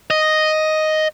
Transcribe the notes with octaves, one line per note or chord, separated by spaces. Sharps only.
D#5